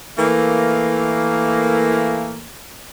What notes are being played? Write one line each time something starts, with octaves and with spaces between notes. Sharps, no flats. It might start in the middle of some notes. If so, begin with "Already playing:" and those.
E3 A3 A#3